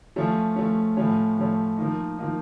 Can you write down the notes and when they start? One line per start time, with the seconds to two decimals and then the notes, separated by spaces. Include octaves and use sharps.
0.16 F3 A3 C#4
0.56 F3 A3 C#4
0.97 A2 F3 A3 C#4
1.37 A2 F3 A3 C#4
1.77 F3 A#3 D#4
2.18 F3 A#3 D#4